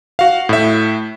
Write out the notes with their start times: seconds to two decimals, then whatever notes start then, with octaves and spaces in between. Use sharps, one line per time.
0.19 F#4 F5
0.49 A2 E5